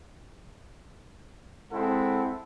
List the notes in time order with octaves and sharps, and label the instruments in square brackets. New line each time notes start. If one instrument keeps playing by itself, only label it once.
[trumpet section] G#3 C4 E4 A4 F#5